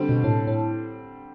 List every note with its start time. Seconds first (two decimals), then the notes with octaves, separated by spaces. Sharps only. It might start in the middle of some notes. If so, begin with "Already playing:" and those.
Already playing: D3 G3 C4
0.09 B2
0.24 A2
0.47 A2